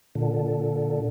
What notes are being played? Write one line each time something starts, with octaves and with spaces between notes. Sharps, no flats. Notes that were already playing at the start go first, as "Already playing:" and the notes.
A#2 D3